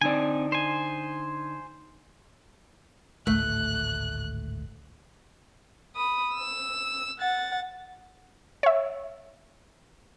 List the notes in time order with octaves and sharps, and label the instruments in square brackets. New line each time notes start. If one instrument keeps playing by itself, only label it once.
[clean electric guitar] D3 D#4 D5 [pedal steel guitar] C4 G#5
[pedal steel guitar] C5 G#5
[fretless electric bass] G#1 D2 A2 [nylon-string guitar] A3 [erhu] F#6
[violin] B5 D#6
E6
F#5 A6
[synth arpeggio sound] C#5 E5